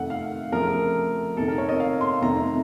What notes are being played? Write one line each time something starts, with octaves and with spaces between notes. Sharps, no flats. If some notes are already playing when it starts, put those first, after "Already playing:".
Already playing: F2 C3 D#3 A3 F#5
F5
F2 C#3 F3 A3 A#4
F2 C3 D#3 A4
A#4
C#5
D#5
F5
C6
F2 C3 D#3 A3 A#5